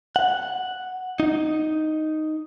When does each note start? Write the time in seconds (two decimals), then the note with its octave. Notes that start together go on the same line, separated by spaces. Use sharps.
0.16 F#5
1.20 D#4